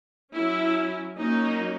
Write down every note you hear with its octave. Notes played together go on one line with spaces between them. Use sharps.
F#3 C#4 E4
F#3 A#3 C#4 D#4